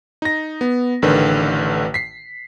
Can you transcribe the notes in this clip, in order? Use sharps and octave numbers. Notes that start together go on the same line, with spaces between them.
D#4 A#6
B3
A1 D3 D#3 B4
B6 C7